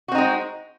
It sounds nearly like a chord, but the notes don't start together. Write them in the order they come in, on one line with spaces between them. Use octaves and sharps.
F#4 C4 D#4 G#3